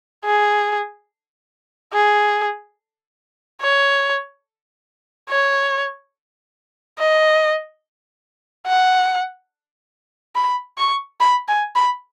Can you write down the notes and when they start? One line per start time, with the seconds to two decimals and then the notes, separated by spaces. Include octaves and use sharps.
0.25 G#4
1.93 G#4
3.61 C#5
5.30 C#5
6.98 D#5
8.66 F#5
10.35 B5
10.78 C#6
11.20 B5
11.48 G#5
11.75 B5